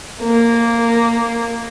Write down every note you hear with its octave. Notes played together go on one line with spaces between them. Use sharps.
A#3